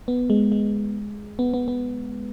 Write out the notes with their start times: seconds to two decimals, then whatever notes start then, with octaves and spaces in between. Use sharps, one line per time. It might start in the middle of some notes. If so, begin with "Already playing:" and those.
0.08 B3
0.30 G#3
0.52 G#3
1.39 B3
1.54 B3
1.68 B3